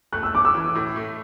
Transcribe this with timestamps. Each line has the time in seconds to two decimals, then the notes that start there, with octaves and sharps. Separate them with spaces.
0.13 A3 F#6
0.23 E6
0.34 C#4 D6
0.45 E6
0.54 E3
0.75 A2
0.96 A3